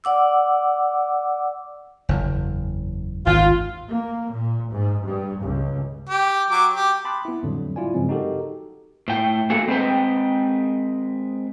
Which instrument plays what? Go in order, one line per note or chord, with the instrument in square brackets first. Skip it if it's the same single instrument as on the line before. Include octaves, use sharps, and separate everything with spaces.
[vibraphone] D5 F#5 D6 E6
[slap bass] F#1 E2
[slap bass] G#1 D#2 [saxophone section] F4
[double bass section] A#3
A#2
G#2
G2
C#2
[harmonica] G4
F#3 D6
G4
[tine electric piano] A5 B5 C6 D6 D#6 F#6
B3 E4
F2 A2 D3 F#3 G3
E4 F4 D5 G#5
G2 C#3 F3 F#3 G#3 C4
D#4 F#4 G4 A4 A#4
[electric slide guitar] A2 G5
A#3 F#4 G#4 A4
G#3 C4 F4 G#4 B4 G5